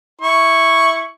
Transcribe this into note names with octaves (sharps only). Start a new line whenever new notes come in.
E4 C#6